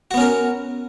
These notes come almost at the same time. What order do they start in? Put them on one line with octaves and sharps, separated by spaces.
F#4 B3 C#4 A#4